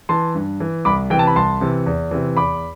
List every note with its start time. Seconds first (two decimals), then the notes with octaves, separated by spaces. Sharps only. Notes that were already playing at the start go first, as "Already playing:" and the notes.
0.09 E3 A5 C6
0.35 G2
0.60 E3
0.85 C2 B5 D6
1.10 C3 E3 G5
1.19 A5
1.27 B5
1.36 C2 A5 C6
1.61 C3 E3
1.86 E2
2.11 C3 E3
2.37 E2 B5 D6